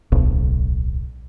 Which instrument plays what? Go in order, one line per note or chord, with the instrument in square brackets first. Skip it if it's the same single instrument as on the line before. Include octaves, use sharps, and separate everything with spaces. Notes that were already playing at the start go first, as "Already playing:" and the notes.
[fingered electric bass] D1 B1